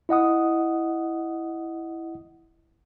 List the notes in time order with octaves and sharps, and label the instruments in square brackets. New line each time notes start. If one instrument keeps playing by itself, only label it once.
[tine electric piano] E4 D#5 F#5 D#6